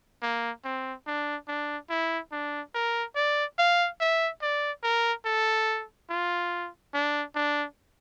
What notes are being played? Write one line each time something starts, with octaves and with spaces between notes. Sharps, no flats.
A#3
C4
D4
D4
E4
D4
A#4
D5
F5
E5
D5
A#4
A4
F4
D4
D4